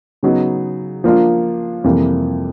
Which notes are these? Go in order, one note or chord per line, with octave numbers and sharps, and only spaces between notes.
C#3 F#3 B3 D#4
F3 A#3 D4 F4
F2 C3 E3 G3 A#3